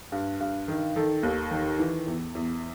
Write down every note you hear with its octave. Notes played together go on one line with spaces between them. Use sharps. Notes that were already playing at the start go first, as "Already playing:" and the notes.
G2
G2
D#3
D#3 A4
D#2
D#3
E3
E2
E2